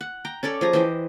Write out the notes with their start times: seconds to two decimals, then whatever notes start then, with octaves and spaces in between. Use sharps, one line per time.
0.01 F#5
0.25 G5 A#5
0.43 C#4 A4 C#5 D5
0.61 F3 G#4 A#5
0.73 E3 G4 C5 D#5